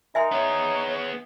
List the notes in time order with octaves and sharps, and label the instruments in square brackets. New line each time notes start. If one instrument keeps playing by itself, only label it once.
[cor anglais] D#4 [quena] A#4 [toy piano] E5 G#5 C6
[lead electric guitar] B3 G#4 [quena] C#5